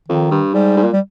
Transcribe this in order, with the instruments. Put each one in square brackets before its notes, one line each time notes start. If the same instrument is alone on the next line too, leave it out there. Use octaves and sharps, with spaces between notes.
[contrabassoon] F2 [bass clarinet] D#3
[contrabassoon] G2
[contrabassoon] G#2 [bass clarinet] G3
[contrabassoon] G#2
A#2
[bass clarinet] G3